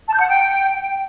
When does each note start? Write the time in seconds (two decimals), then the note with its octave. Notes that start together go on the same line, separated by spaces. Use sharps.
0.07 A5
0.14 G6
0.21 F#5
0.28 G5